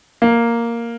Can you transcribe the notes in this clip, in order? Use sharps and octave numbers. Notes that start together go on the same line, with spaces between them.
A#3